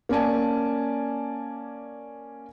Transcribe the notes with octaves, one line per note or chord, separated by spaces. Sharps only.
A#3 C#4 D5 G#5 A5